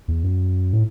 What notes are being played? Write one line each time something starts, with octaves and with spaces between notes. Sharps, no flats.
E2
F#2
A2